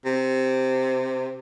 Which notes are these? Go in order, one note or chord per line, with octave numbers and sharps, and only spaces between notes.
C3